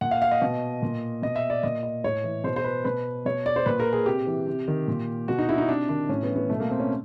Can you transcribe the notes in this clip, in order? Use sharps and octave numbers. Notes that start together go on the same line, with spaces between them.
A#2 F#5
F5
F5
D#5
B2
A#2
B2 D#5
E5
D5
A#2 D#5
D#5
A2 C#5
E3
B2 C5
C5
B4
B2 B4
B2 C#5
D5
C5
A#2 B4
A#4
G#4
C3 G4
E3
C3
D#3
A#2
B2 F#4
D#4
E4
D#4
C3 D4
D#3 D4
A2 C#4
B3
E3
B3
B2 A3
A#3
C4
C#4